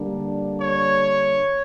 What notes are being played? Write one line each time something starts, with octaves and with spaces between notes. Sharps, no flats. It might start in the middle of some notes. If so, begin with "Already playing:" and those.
Already playing: D3 G3 A#3 D4
C#5